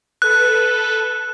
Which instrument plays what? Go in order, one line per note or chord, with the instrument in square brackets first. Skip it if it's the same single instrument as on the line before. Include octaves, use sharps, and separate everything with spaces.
[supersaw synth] A4 B4 [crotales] F#6